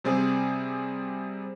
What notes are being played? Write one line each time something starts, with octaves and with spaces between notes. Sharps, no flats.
C3 G3 C4 G#4